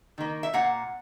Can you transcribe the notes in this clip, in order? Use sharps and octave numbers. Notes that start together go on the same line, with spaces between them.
D#3 A#3
E5
A#2 A#3 F#5